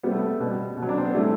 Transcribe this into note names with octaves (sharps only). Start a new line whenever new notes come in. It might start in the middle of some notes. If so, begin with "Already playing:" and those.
C3 G3 B3
A3
B3
B2 G3
B2
F#3
D4
C4
B3
A2 E3 G3 A3